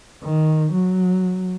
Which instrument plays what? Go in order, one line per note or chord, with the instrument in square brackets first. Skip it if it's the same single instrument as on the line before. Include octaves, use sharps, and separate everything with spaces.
[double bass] D#3
F#3